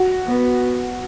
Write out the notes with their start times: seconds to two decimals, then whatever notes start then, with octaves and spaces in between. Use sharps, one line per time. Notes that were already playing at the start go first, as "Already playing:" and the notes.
Already playing: F#4
0.27 B3